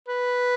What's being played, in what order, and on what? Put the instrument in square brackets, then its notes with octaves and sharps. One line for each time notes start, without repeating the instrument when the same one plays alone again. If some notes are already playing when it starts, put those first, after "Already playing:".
[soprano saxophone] B4